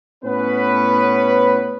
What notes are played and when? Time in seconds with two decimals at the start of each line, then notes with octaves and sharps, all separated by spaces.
0.24 A2 B3 C#4 B4